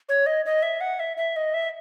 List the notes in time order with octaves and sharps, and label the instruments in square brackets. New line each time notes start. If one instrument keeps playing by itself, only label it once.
[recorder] C#5
D#5
D#5
E5
F#5
E5
E5
D#5
E5